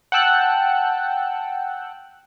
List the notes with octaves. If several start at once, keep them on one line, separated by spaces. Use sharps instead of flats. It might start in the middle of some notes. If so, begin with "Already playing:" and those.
F#5 G5 A5 E6 F#6